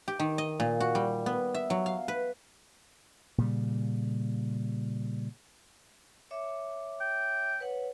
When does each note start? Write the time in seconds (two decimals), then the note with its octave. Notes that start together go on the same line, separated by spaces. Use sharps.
0.08 G4
0.19 D#3
0.38 D#5
0.60 A#2
0.80 F#4
0.95 G3
1.26 B3
1.54 E5
1.70 F#3
1.86 F5
2.08 B4
3.38 A#2 C#3 G3
6.31 C#5 E5 D6
7.01 G5
7.60 B4 C#5 F#5